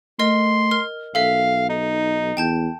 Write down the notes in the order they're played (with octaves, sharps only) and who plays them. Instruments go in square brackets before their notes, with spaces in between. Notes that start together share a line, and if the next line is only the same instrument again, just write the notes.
[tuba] A3 [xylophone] A#4 D#5 [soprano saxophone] C6
[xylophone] A#4 F6
[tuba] B1 [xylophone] A4 E5 [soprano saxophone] F5
[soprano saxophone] D#4
[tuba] E2 [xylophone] G5 A5 G6